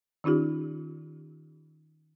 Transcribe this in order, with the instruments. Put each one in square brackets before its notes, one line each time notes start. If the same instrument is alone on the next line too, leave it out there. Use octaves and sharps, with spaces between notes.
[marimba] D#3 C#4 D#4 F4 G4